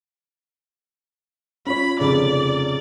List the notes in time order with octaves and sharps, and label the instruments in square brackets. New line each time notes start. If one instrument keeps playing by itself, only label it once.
[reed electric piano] C#4 F4 C#5 [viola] B5
[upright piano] F1 C#3 [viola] D5